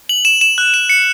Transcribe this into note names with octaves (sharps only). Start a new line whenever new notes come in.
F#7
E7
E7
F#6
E7
C#7